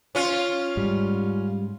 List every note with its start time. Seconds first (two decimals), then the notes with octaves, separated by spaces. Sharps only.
0.15 C#4 F4
0.77 G#2 G3